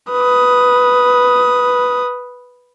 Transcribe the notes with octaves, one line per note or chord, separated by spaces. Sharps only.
B4 D#6